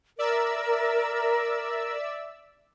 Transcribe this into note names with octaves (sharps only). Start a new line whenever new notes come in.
A#4 D5 E5 E6